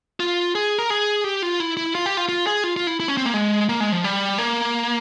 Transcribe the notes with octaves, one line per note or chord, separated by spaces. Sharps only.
F4
G#4
A#4
G#4
G4
F4
E4
E4
F4
G4
F4
F4
G#4
F4
F4
E4
E4
C#4
C4
A#3
G#3
A#3
G#3
F3
G3
A#3